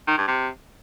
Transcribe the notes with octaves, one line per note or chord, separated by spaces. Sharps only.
D#3
G2
C3